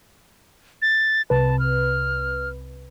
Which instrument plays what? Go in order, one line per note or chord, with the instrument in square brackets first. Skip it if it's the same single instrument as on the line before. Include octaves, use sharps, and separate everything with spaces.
[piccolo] A6
[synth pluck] C2 C3 B4 [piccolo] A5
[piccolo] F6